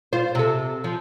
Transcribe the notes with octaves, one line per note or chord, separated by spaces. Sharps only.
F4 C5
C3 A4
F3